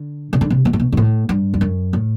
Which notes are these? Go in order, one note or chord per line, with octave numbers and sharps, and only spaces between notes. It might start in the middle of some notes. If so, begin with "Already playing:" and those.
Already playing: D3
C3
D3
C3
B2
A2
B2
G2
A2
G2
E2
F#2
A2